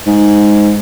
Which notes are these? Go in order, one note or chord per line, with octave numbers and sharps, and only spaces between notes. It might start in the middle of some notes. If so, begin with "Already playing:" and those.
G#2